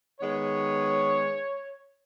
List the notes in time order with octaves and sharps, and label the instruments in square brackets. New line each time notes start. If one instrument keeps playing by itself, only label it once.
[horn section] D#3 G#3 B3 C#5